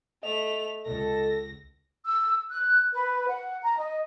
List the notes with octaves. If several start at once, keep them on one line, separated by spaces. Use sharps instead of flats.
A3 D#5 F7
C#2 A4 A#6
E6
F#6
B4
F#5
A#5
D#5